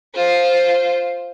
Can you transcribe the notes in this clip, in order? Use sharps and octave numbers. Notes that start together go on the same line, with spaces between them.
F4 C5